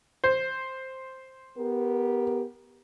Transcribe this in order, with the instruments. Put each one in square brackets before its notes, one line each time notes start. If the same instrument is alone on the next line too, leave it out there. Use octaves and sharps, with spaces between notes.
[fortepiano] C5
[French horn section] B3 G4 A#4